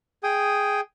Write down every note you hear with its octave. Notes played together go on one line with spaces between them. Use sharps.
G#4 G5 D#6